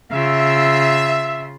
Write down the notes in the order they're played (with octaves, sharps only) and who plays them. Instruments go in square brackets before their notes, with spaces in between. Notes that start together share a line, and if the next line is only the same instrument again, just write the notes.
[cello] C#3 F4 [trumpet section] E5